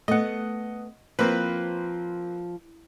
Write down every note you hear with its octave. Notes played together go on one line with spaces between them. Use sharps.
A3 B3 D#5 F#5
F3 A#3 C4 B4